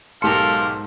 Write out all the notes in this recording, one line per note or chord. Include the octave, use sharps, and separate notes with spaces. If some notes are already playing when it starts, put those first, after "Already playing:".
B1 G#2 G4 A4 A#4 F5 C6 C#7